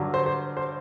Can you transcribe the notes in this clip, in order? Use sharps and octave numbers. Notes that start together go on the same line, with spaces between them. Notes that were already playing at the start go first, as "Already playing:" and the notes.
Already playing: G2 D3 F#3
C5
C5
C5